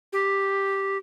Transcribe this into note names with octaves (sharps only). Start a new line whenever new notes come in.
G4